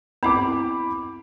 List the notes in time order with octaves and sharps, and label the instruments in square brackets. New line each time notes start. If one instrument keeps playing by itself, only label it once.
[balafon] B3 C4 E4 [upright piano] B5 D6